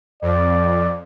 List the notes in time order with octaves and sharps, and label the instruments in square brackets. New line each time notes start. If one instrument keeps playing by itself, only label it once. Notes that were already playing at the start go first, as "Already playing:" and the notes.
[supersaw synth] F2 [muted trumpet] D5